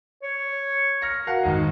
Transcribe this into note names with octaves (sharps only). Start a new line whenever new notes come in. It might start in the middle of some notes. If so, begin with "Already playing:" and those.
C#5
F6 A#6 C#7
F#4 A#4 F5 F#5
G#1 D#4